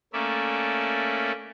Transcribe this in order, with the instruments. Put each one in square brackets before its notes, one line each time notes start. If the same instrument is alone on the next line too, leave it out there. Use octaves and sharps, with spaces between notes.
[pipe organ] A3 A#3 C#4 D5 E5